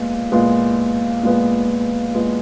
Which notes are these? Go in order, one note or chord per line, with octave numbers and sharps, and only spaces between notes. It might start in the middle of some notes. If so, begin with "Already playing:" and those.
Already playing: A#2 G#3 B3
A#2 G#3 B3
A#2 G#3 B3
A#2 G#3 B3